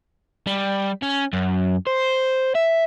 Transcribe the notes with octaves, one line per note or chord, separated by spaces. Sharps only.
G3
C#4
F#2
C5
E5